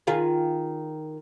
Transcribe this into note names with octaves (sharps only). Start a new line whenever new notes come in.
D#3 F4 G#4